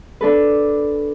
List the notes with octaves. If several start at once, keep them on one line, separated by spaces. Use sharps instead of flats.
D4 A4 B4